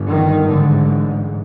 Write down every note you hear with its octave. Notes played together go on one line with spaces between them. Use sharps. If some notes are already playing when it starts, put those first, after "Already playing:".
Already playing: G1 G2
D#3
A1 G#2 D3